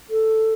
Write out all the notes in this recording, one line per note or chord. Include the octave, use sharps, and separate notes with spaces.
A4